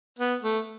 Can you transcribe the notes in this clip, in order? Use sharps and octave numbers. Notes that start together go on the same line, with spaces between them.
B3
A3